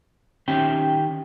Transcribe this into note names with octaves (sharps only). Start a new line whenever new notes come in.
D#3 C#4 G4 E5 G5